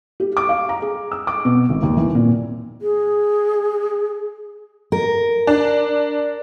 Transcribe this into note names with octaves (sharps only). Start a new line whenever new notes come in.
G4
D6
F5
A#5
G#4
E6
D6
B2
G#1
D#2
E3
A#2
G#4
A#4
D4